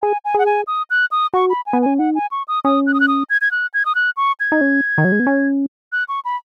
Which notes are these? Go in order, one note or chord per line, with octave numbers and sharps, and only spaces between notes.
G#4 G#5
G#5
G#4 F#5
G#5
D#6
F#6
D#6
F#4 C#6
B5
G#5
B3
C#4 G#5
D#4 F#5
G#5
C#6
D#6
C#4 D#6
F#6
D#6
F#6
D#6
G#6
G#6
F#6
G#6
D#6
F#6
C#6
G#6
D#4
C#4
D#3
F#3
G#3
B3
C#4
F#6
C#6
B5